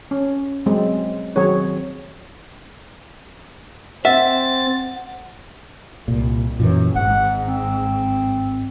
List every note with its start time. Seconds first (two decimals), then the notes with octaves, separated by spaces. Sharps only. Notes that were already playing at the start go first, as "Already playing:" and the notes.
0.11 C#4
0.66 F#3 G#3 C4
1.36 D#3 F#3 C4 F#4 G#4 C#5
4.05 C4 E5 F#5 A6
6.08 C2 A#2
6.60 F#2 A#2 D3 E3
6.95 G#1 G#2 F#5
7.46 C4